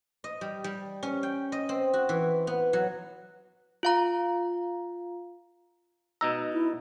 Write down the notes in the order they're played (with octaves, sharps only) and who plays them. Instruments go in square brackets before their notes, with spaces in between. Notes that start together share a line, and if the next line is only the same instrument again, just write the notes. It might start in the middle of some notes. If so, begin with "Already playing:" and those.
[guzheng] D#5
G3
G3
C#4
G5
D#5
C4
F#4
E3
B3
F#3
[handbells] F4 F5 A#5
[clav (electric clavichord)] B2 D#4 A#5 [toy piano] E6
[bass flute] E4